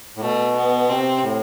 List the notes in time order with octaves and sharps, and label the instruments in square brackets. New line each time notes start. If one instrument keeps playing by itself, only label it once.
[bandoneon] A2
[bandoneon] B2 [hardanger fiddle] A3
[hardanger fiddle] B3
[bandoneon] C3 [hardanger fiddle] C4
[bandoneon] A2